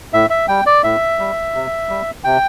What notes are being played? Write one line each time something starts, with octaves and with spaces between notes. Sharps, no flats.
A2 E5
E5
G3 G5
D5
A2 E5
G3
C3
G3
C3 G5